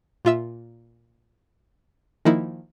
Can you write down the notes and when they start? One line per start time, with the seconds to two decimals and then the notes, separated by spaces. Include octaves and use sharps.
0.25 A#2 F4 E5 E6
2.25 D#3 F3 A#3 D#4 E4